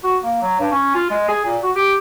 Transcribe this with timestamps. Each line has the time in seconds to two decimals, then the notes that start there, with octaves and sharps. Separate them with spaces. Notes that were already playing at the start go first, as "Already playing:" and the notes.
0.03 F#4
0.23 A#3
0.41 F#3
0.59 G2
0.71 C#4
0.94 F4
1.10 G#3
1.28 G#4
1.45 A#2
1.63 F#4
1.75 G4